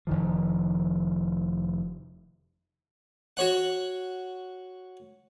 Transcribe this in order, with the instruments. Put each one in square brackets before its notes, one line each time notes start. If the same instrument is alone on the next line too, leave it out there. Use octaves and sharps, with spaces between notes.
[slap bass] F1 D#3 F3
[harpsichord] F#4 C#5 F#5